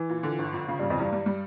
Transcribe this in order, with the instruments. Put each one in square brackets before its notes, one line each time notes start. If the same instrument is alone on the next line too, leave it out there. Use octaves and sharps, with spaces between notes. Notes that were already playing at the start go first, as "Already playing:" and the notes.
Already playing: [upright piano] E3
[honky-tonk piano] A#2
D3
G1
F2
C#3
[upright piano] G2
[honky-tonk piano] C#3
[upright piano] F2
[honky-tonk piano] E2 [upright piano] G2
[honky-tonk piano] G3
G3